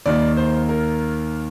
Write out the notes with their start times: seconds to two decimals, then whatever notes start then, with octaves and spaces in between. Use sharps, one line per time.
0.06 D#2 D#3 A#3 D5
0.37 C5
0.69 A#4